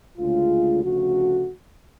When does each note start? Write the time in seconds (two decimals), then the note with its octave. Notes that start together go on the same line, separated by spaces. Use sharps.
0.18 D2 C#3 G#3 F4
0.83 D2 C#3 F3 A3 F#4